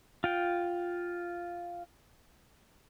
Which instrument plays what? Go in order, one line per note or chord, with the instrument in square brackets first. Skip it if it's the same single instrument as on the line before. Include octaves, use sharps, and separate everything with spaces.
[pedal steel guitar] F4 G5